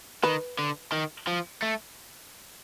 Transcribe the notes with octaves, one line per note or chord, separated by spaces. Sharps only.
D#3 B4
D3
D#3
F3
A3